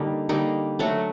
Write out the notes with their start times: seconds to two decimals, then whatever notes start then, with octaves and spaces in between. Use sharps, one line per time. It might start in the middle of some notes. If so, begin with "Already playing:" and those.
Already playing: D3 G3 A#3 D#4
0.29 D3 G3 A#3 D#4
0.79 F#3 A3 D4 F#4